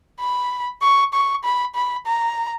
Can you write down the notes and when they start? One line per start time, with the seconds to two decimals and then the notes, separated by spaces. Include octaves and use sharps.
0.20 B5
0.82 C#6
1.13 C#6
1.44 B5
1.75 B5
2.06 A#5